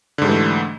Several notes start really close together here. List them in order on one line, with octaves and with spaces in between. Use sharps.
D3 G#2 G3 E3 A3